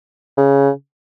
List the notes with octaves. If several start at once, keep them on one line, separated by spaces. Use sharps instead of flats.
C#3